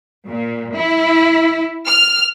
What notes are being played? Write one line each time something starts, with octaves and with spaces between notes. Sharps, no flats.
A#2
E4
F6